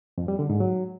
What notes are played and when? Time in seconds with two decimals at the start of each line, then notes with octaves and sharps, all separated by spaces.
0.18 F2
0.28 G3
0.39 D3
0.50 G#2
0.60 F#3